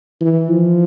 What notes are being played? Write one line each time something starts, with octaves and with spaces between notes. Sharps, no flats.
E3
F3